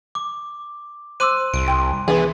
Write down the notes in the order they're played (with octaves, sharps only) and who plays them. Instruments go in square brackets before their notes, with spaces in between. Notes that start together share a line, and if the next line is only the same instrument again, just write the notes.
[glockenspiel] D6
[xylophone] C5 D6 E6 [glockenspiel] C6 F#6 D#7
[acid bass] C2 [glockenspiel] D7
[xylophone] G5 C6
[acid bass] E3 [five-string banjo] B3 E4 G#4